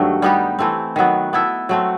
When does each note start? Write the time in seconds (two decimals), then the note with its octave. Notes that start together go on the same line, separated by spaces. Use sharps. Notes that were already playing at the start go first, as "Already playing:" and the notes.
Already playing: G2 D#3 F#3 A3
0.22 G3 B3 D#4 G4
0.59 E3 A3 C4
0.96 D#3 F#3 B3
1.33 B3 E4 A4 E5
1.69 F#3 A3 C4